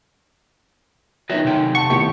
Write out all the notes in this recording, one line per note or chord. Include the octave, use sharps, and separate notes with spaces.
D#3 F#3 B4 D#5 E5
C3 A3 G5
F#5 A5 C#6
G#1 A2 G4 C#7